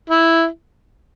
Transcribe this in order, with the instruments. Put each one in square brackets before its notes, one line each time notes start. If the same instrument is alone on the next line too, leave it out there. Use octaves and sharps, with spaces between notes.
[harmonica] E4